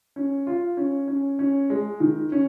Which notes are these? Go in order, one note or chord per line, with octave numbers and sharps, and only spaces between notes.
C#4
F4
C#4
C#4
C#4
G#3
D#3
C#4